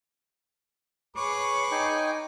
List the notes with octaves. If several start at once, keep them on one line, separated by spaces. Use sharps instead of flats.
G#4 B4 C#5 C#6 D6
D#4 G5 G#5